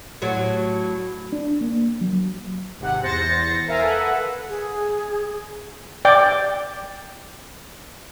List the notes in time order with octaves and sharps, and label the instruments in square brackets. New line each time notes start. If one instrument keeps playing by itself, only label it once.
[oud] A2 F#3
[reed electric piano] D4
A#3
F#3
[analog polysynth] G#1 C3 F#5
E2 C5 A6 A#6 C#7
A#4 E5 F5 G#5 A#5
A4 B4 E5 F#5
[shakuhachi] G#4
[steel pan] D5 G5 D6